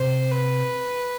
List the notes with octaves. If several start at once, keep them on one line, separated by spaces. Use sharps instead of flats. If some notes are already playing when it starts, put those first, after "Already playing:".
Already playing: C3 C5
B4